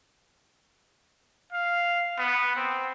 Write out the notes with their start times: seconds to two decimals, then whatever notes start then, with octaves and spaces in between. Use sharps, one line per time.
1.52 F5
2.18 B3
2.56 C4